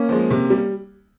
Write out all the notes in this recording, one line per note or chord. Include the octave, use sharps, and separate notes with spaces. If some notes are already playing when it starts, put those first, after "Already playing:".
Already playing: A#3 C#4
F3 G#3
C3
G3